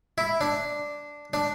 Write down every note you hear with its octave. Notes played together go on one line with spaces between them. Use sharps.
E4
D4
D4